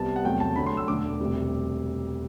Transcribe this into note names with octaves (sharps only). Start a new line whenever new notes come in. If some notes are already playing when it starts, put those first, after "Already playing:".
Already playing: C2 C3 G3 B3 A5
F#5
E2 C3 F#3 A3 G5
A5
D2 D3 F#3 A3 B5
C6
E6
E1 D2 D3 A3 D6
E1 D2 C3 G3